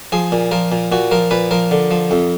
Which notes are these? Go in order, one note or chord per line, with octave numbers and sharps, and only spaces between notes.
F3 G#4
A#2
F3 A#4
A#2
A#2 F#4
F3 A#4
A#2 B4
F3 A#4
D3
F3
F2